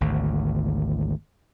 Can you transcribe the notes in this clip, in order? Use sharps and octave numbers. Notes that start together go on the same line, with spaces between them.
G#1 D2